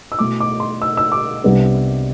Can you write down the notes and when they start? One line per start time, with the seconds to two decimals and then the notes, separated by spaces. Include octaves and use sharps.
0.12 E6
0.19 B2 A3 E4 D6
0.40 D6
0.60 C6
0.82 E6
0.97 E6
1.12 D6
1.43 C2 C3 G3 B3 D4